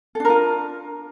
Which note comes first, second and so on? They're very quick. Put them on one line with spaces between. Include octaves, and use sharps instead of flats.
A4 D4 A#4 F4